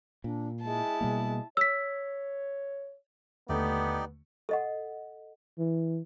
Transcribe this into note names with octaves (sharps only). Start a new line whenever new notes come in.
A#2 D4
G#3 E4 A5
B2 G3 A#3
C#5 E6 B6
D#2 D3 A3 B3 D#4 G4 D5
A4 D#5 F#5
E3